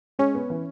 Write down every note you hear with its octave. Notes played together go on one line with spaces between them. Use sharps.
G#3 C#4
B3
E3